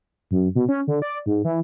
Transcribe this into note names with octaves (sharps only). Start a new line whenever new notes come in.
F#2
B2
C#4
D3
D5
G#2
E3